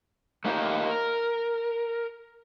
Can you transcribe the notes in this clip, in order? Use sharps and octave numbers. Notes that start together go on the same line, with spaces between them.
A3 A#3 D#4 G4
A#4